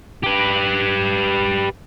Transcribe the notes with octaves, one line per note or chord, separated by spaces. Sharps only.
G4 B4